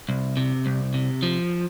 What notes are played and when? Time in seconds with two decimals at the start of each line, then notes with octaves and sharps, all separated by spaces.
0.09 C2
0.37 C3
0.66 C2
0.94 C3
1.23 F3